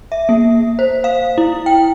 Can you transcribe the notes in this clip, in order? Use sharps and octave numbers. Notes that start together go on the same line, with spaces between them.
E5
A#3
C5
F5
E4
G5